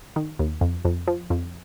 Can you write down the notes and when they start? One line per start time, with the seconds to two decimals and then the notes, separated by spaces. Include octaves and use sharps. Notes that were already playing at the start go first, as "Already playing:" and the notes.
0.16 D#3
0.39 D#2
0.61 F2
0.85 F2
1.07 F3
1.30 F2